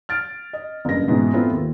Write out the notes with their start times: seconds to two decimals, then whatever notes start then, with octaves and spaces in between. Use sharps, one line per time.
0.09 F6 A6 D7
0.53 D#5
0.85 F#1 G2 A#6
1.08 G#2 B2 E3
1.34 B3 C4 E4 F4 A4
1.51 D#2